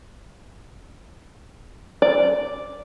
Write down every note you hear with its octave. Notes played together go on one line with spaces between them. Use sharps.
D5